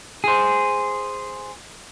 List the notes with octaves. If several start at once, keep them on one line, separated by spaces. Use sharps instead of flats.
G#4 C5